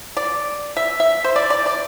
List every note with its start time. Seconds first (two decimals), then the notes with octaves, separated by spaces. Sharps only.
0.17 D5
0.77 E5
1.00 E5
1.24 C5
1.36 D5
1.50 D5
1.66 D5